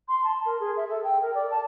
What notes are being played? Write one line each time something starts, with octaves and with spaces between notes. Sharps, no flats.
C6
A5
A#4
G#4
E5
A4
G5
A#4
D5
A5